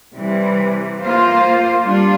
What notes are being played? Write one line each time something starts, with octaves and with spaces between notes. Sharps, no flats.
C3 E3 G3
A#3 F4 C5 F5
G3 D4 F4